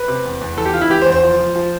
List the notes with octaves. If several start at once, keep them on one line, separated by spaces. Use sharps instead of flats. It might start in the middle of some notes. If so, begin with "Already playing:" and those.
Already playing: B4
C3
E2
E2
E3 A4
G4
E3 F4
E4
E3 G4
C5
E2
C5
F3
F3
F3